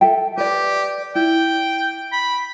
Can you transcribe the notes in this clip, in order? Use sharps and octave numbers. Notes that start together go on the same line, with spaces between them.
A4 E5 G5
G4 B4 D5
E4 G5
B5